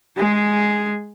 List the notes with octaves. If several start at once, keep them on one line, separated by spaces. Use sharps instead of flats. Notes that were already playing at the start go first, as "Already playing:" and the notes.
G#3 G#4